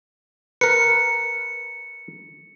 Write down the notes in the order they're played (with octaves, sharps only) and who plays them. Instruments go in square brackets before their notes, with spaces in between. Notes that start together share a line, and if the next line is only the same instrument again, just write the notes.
[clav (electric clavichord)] A#4 B4 [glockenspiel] C#7